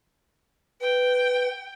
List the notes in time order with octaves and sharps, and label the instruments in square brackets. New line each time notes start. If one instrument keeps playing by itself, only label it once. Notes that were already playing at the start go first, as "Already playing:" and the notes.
[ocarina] B4 [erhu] G5